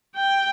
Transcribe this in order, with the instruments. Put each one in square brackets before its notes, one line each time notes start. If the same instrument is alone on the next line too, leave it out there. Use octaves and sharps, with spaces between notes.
[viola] G5